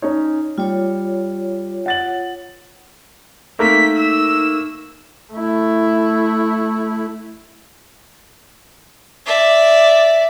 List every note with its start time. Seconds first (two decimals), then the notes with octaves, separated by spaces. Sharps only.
0.02 C#4 D#4 C#5
0.58 G3 F4 C#5
1.86 F#5 A6 F#7
3.59 A3 A#3 C4 D#4 B6
3.97 E6
5.33 A3 E4
9.26 D5 E5